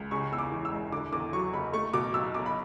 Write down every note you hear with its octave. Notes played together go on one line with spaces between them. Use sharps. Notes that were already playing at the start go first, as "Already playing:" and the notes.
Already playing: C#2
C#3 C#6
E2 E6
D6
E3
E6
E1
D3 D6
E2 D6
F#3 C#6
F#1 B5
A3 C#6
B2 D6
B1 E6
B1 D6
B5